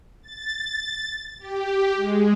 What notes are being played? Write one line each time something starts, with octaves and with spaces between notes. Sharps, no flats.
A6
G4
G#3